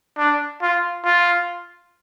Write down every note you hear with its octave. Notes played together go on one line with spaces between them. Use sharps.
D4
F4
F4